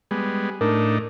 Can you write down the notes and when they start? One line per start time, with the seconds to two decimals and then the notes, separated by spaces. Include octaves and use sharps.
0.11 G3 G#3 B3
0.61 A2 D4 D#4 A#4